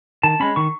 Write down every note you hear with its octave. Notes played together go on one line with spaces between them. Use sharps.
D#3 A5
G#3 C#4 B5
D#3 C#6